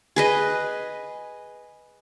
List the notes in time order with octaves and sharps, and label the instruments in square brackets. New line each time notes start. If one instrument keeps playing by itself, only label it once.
[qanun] G#4 B4 D#5